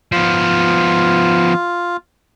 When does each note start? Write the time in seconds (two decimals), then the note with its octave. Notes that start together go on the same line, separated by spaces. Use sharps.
0.12 F3 B3 F4